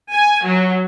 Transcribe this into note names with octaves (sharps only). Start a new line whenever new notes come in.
G#5
F#3